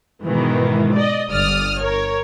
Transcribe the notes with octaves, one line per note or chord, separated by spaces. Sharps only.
G#2 B2 D#3 E3
D5 D#5
G1 D5 D#6 F6
A#4 C#5